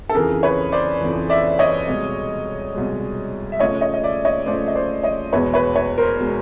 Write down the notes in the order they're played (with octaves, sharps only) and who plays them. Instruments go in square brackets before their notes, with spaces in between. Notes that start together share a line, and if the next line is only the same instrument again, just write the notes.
[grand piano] A4
[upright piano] F2 C#3 E3 [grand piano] G#4 A#4
[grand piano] B4 C#5
C5 D5
[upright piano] F2 C#3 E3
[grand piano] D5 E5
C#5 D#5
[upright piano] C2 B2 G#3
C2 B2 G#3
[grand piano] E5
[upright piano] C#3 F3 A3 [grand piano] C#5 D#5
[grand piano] C#5 D#5
D#5
D5 E5
C#5 D#5
[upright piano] C#3 F3 A3 [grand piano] C5 D5
[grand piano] D#5
C5 D5
C#5 D#5
[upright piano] E2 B2 G#3 [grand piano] B4 C#5
[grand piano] B4 C#5
B4 C#5
A#4 C5
[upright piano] B2 G#3